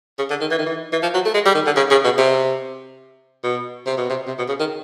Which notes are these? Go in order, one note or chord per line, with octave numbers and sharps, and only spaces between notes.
C#3
D3
D#3
E3
D#3
E3
E3
F3
F#3
A3
G#3
G3
D#3
D3
C#3
C#3
B2
C3
B2
C3
B2
C3
C3
B2
C#3
D#3